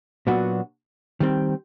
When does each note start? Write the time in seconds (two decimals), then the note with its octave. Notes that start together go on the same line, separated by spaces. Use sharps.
0.27 A#2 F#3 B3 D4 F#4
1.20 D#3 G3 C4